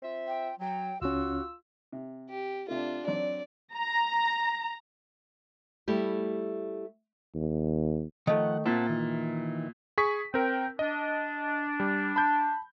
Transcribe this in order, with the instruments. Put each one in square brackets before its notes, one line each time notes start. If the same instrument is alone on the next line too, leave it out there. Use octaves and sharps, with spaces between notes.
[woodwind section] C4 F4 E5
[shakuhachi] G5
[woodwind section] F#3 [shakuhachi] G5
[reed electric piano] C#2 C#4 [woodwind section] F4 E6 [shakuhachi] F#4
[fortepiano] C3
[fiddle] G4
[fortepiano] C3 A3 [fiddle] D4 F4
[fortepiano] F#3 C4 D4 [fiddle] D5
[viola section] A#5
[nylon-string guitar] G3 A3 E4 G4
[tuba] D#2
[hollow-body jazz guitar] D#3 A3 [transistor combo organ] F3 F#5
[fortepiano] A#2 [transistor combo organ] C4 F#5 A5 [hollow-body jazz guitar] E5
[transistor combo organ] D#3 E3
[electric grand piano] G#4 C#6 B6
[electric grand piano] C4 A#4 [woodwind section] G5
[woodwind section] D4 [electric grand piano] D#5
[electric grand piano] G3
[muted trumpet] A5 [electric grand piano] B5 G6